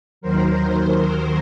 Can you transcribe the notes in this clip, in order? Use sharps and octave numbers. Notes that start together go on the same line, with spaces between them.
D#2 D#3 F#3 A#4 C5